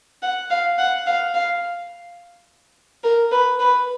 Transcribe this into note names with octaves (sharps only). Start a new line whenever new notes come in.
F#5
F5
F#5
F5
F5
A#4
B4
B4